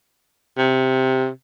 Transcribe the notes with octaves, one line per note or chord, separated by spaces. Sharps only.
C3